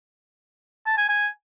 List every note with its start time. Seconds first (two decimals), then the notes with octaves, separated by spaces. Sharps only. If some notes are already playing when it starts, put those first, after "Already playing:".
0.86 A5
0.98 G#5
1.09 G#5